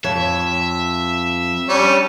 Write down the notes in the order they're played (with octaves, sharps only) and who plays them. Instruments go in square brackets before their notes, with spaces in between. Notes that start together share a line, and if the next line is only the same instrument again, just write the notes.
[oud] F2 C#5 [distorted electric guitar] E5
[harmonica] G3 C#4 D4